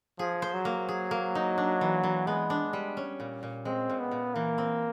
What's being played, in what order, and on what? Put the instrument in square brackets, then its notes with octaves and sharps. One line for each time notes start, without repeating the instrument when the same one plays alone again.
[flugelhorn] F3 [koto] G#4
[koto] C5
[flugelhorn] F#3
[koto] A#3
G#4
A#3
D#4
D4
E3
E3
[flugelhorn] G#3 [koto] B3
[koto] D4
G3
C#4
A#2
A#2
[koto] G#3 [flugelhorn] C4
[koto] A#2
[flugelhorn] B3
[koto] A#2
[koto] E3 [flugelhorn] A#3
[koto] C4